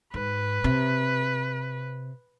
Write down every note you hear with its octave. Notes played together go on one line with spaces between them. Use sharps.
G#2 B4
C3